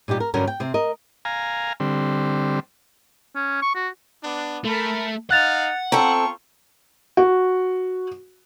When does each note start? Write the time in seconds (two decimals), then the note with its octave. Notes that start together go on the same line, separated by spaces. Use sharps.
0.08 A#2 G3 D#4 G4
0.20 A#4
0.34 G2 D3 F#3 C#4 F#4 A#4
0.47 G5
0.60 C3 C4
0.74 A#4 D#5
1.25 F5 G#5 A#5
1.80 D3 G3 C4
3.35 C#4
3.62 C#6
3.75 F#4
4.23 B3 D4
4.65 A3 A#4 A5 B5
5.31 D#4 F5 F#5 F#6 A6 F7
5.92 C4 F4 A4 A#5 C#6
7.17 F#4